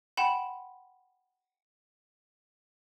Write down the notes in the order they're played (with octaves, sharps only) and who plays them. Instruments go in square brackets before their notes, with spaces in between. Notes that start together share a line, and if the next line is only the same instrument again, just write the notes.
[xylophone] F#5 G5 B5 C6 E7